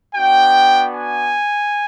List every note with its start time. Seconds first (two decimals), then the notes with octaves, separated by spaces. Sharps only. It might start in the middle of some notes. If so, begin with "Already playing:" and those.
0.15 B3 D4 F#4 G5
0.94 G#5